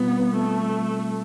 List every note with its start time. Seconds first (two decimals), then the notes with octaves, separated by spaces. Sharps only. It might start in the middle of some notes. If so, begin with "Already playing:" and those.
Already playing: B2 G3 B3 C4 F4
0.36 A3